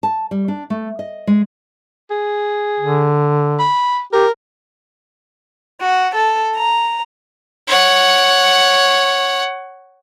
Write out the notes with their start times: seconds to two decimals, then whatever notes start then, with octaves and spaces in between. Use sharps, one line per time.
0.03 A5
0.31 G3
0.48 D4
0.70 A3
0.99 D#5
1.27 G#3
2.10 G#4
2.80 D3
3.59 B5
4.13 G4 A#4
5.80 F#4
6.15 A4
6.56 A#5
7.67 C#5 F#5